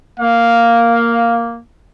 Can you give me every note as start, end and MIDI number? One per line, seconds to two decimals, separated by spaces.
0.20 1.59 58
0.20 1.36 77